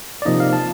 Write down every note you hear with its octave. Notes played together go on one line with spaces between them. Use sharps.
D5
C3 F3 A#3 D#4 D#5
F5
A5